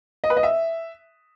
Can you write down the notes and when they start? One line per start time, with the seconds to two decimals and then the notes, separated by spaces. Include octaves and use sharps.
0.24 D#5
0.30 B4
0.37 D#5
0.43 E5